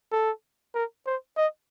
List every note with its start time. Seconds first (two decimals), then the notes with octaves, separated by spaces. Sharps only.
0.12 A4
0.74 A#4
1.06 C5
1.37 D#5